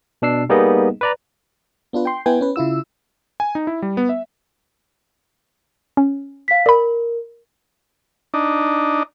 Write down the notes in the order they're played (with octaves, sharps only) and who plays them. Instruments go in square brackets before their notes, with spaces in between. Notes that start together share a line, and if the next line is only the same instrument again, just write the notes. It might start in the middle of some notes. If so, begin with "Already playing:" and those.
[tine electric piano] B2 D4 E6 C7
G3 A#3 B3 D#4 G#4 D#5
B4 D5 A#5
[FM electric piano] B3 D4 F4 B4
G5 C6
B3 E4 B4 G5 G#5
C#4 B4
C#3 E4 F4 E6
[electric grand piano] G#5
D#4
E4
G3
B3
E5
[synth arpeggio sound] C#4
[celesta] F5 B6
[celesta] A#4 [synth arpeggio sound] D5 B5
[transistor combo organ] D4 D#4